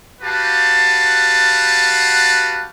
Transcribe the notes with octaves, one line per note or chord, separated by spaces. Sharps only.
F#4 G4 B4 F5 F#5 A5